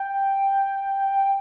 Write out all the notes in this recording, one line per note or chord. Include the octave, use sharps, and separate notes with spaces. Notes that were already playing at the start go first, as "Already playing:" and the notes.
Already playing: G5